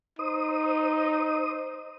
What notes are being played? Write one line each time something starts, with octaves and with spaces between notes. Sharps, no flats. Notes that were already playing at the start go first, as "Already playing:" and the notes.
D#4 C5 D#6